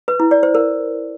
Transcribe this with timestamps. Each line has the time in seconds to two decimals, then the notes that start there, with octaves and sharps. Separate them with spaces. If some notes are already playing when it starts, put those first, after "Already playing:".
0.08 B4
0.20 E4
0.31 D5
0.43 C5
0.55 A#4